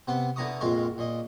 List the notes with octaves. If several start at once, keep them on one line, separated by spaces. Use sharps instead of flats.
C3 B3 F#5 C6
D3 B3 E4 A#5 C#6 D#6
A#1 F2 G#3 F4 A#4 C#6
A#2 D#5